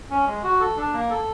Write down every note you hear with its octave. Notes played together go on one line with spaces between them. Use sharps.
C#4
G#3
F#4
A4
D4
A#3
A4